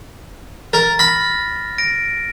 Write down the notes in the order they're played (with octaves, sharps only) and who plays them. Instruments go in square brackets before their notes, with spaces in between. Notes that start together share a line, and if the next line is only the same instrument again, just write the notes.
[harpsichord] A#4 [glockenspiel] A6
[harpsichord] B5 [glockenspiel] F6 A#6
[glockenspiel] A#6 D7